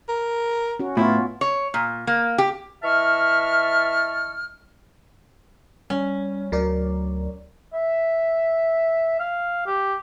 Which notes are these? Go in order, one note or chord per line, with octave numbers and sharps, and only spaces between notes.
A#4
C#4 F#4
A2 B3 E4 F4
C#5
A#2
A#3
G4
E3 D#5 E5 A5 C#6 F6
G3 C#4
D2 F#3 A#4 D5
E5
F5
G4